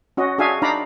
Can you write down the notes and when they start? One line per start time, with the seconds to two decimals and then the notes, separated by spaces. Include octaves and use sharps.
0.17 C#4 F#4 D#5
0.38 D4 F#4 G#4 E5 F5 G#5
0.62 D4 D#4 D5 F5 A#5 B5